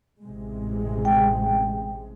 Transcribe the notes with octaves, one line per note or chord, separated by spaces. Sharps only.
A1 C3 G#3
G5